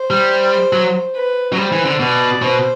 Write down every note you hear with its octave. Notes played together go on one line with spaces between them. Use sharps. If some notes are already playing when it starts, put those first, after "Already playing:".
Already playing: C5
G3
F#3
B4
F#3
G3 C5
E3
D3
B2 D5
B2 C5